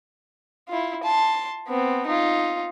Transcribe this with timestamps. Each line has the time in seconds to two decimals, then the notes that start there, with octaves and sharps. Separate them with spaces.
0.69 E4 F4
1.03 A5 C6
1.68 B3 C4
2.07 D#4 F4